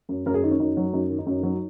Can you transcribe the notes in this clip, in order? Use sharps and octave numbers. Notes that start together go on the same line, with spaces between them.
F#2
F#2 A#4
G#4
D#3 D#4
C#4
F#2 D#4
F#3
F#2 D#4
D#3
D#4
F#2
F#3